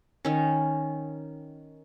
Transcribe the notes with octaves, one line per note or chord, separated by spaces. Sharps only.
D#3 C#4